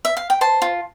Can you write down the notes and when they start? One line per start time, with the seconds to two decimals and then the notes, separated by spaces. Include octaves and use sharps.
0.05 E5
0.17 F5
0.30 G5
0.41 C5 A5
0.62 F4